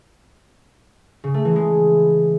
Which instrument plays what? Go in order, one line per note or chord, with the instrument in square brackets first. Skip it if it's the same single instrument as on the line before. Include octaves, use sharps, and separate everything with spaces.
[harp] C#3
A3
E3
G#3